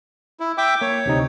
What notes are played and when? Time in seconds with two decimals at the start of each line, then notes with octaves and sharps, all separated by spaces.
0.40 E4
0.58 E5 G5 D6
0.81 A#3 C#5
1.06 D2 C3 D#4